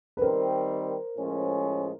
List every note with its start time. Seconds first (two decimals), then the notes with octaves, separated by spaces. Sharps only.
0.17 B4
0.22 D#3 G3 C4 A#4 C5
1.16 A2 F3 G#3 C#4